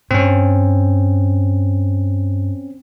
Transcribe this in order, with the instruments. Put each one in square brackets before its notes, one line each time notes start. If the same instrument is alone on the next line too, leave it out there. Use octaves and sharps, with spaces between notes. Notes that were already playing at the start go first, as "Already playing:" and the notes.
[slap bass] G2 [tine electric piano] C4 C#4